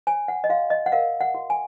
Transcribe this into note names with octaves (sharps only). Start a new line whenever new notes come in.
C#5 G#5
F#5
D#5
F#4 F5
D#5
F#5
A#4 F5
F#5
F#4
G#5